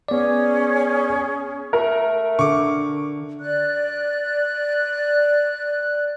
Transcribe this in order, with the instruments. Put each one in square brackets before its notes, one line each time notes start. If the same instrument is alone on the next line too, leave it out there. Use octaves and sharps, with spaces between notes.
[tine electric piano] B3 D5 [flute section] C#4 G#4
[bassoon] A3 [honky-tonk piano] A#4
[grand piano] D3 [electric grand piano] C#6 D6
[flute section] D5 F#6